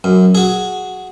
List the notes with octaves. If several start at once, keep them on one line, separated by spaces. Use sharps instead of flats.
F#2
F#4 G#4